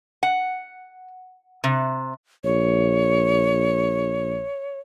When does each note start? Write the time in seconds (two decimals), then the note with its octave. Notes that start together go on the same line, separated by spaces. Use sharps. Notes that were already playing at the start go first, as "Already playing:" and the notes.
0.23 F#5
1.64 C3
2.44 A#1 C#5